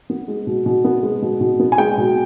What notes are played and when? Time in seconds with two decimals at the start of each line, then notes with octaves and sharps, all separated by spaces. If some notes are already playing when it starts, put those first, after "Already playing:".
0.10 B3
0.28 G#3
0.47 B2
0.66 B2
0.85 B3
1.03 G#3
1.22 B2
1.41 B2
1.60 B3
1.72 G#5
1.78 G#3 G5
1.98 B2